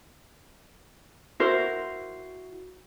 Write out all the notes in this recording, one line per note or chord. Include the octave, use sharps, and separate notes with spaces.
E4 F#4 A#4 C5